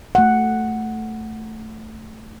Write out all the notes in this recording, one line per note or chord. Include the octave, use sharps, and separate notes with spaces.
A3 F#5